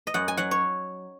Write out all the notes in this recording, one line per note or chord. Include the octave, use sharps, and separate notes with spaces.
D#5
F#2 F#5
G#5
F#3 F#5
C#5